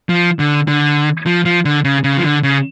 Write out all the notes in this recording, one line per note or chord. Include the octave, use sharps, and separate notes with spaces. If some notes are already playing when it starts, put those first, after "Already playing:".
F3
D3
D3
F3
F3
D3
C#3
C#3
F3
D3
C#3